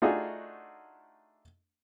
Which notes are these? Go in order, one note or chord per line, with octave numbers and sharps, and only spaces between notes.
A3 D4 D#4 F4 F#4 G#4